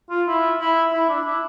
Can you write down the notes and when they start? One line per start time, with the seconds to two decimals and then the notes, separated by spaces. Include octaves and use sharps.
0.10 F4
0.27 E4
0.60 E4
0.93 E4
1.09 D4
1.26 E4